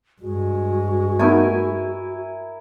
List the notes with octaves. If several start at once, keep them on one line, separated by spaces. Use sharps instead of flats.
G2 G#3 F#4
A3 B3 D#4 E4 A#4 G#5